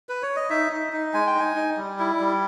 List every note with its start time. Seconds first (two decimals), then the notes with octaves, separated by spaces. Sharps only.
0.09 B4
0.23 C#5
0.36 D#5
0.50 D#4 E5
0.71 D#4
0.92 D#4
1.14 G#3 G#5
1.27 G5
1.35 D#4 G#5
1.56 D#4
1.77 G3
1.99 E4
2.20 G3